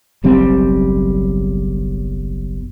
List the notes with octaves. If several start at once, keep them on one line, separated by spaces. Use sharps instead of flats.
F#1 B1 G3 C4